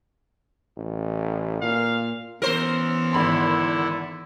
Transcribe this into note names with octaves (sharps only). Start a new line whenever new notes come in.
A1
A#2 F5
E3 B3 C#4 A#4 C5
G#1 D3 E4 B5 C6